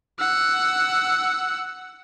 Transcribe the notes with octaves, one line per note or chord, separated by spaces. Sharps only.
F#5 E6